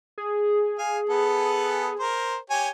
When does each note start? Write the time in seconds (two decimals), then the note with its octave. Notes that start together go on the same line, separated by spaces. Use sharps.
0.18 G#4
0.78 F5 G#5
1.10 B3 A4 B4
1.99 A#4 C5
2.50 G4 C#5 G#5